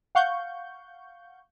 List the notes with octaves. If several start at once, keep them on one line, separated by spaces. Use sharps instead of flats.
F5 F#5 C#6 G6